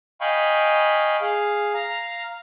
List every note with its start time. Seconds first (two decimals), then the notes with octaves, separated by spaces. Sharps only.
0.21 D#5 F5 G5 G#5 B5 C#6
1.21 G#4 F5
1.74 F5 A#5